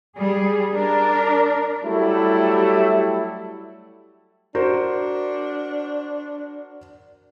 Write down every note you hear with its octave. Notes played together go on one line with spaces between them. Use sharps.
G3 G#4
D4 A#4
F#3 G3 A3 E4
D4 F#4 A#4 C5